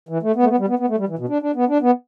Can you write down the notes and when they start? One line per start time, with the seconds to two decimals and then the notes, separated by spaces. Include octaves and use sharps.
0.09 E3
0.23 A3
0.36 B3
0.43 A3
0.49 B3
0.59 G3
0.68 B3
0.79 B3
0.89 A3
0.98 G3
1.08 E3
1.19 B2
1.29 D4
1.42 D4
1.55 B3
1.69 D4
1.82 B3